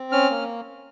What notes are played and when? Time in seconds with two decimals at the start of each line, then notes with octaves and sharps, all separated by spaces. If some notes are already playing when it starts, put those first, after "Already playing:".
Already playing: C4
0.12 C#4 F6
0.30 A#3